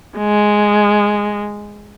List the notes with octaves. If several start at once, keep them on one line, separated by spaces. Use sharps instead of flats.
G#3